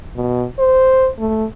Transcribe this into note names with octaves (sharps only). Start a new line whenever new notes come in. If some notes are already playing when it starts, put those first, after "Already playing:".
B2
C5
A3